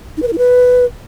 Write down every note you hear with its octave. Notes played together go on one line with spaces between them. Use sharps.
D#4
B4
A#4
E4
B4